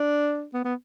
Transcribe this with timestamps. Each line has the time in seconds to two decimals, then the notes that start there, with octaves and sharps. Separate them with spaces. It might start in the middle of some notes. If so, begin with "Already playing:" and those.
Already playing: D4
0.54 B3
0.65 B3